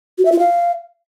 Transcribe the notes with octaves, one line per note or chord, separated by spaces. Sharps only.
F#4
E5
F4
F5